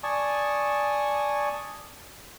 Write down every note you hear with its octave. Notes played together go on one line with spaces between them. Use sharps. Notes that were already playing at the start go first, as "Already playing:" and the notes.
D5 G#5 A5 C#6 D#6